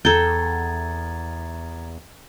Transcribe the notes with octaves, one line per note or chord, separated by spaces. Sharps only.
E2 A4 G5 A#5 G#6 A6